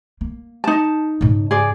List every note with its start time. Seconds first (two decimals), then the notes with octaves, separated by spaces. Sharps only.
0.21 A#3
0.64 D#4 A5
1.21 G#2 C#3
1.51 G#4 D5